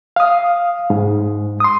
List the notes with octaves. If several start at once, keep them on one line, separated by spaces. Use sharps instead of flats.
F5 D#6
G#2
C6 D#6